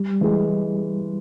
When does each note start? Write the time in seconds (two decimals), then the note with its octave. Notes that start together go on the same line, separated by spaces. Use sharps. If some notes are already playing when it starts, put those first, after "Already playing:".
Already playing: G3
0.21 E3 G#3